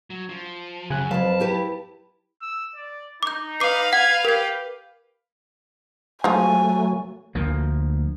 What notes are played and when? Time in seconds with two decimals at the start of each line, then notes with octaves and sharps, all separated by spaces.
0.10 F#3
0.29 F3
0.90 F#2 C#3 G#5 F#6
1.11 F2 F#3 B4 F5 A5
1.40 E4 G4 B4
2.42 E6
2.76 D5
3.23 D#4 D6 G6
3.60 B4 F5 D6 C7
3.93 F#5 G#6
4.25 G4 A#4 G#6
6.24 F3 F#3 G#3 A3 G#5
7.35 D2 F3 A#3